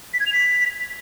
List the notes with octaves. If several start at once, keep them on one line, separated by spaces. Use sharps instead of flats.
B6
G#6
F7
B6